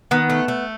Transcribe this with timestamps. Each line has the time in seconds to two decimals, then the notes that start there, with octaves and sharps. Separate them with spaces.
0.11 D#3 B3
0.30 A3
0.48 A3